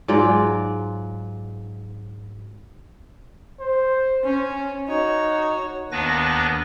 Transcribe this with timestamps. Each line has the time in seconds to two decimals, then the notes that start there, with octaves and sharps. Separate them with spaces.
0.08 G#2 F#3 F4 D5
3.60 C5
4.24 C#4
4.88 D#4 F#4 C#5
5.92 D#2 D#3 B3 D4 B4 A#6